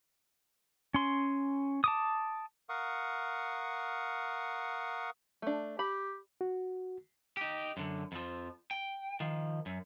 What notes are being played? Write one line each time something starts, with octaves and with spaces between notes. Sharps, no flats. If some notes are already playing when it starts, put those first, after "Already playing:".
C#4 C6
A5 D6 D#6
A#4 F5 F#5 C#6 D#6
A3 D4
G4 B5
F#4
D#4 G4
F#2 D3
F2 F3
G5
D#3 F3
F#2